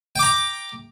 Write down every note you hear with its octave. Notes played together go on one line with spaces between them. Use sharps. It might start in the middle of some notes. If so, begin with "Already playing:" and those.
G5 A#5 D6